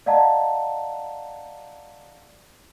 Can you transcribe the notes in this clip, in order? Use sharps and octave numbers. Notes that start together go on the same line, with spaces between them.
D5 D#5 F5 F#5 A5 A#5